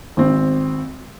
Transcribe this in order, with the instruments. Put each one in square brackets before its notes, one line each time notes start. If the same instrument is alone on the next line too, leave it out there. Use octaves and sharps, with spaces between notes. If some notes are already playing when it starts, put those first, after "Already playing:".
[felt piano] G#1 C4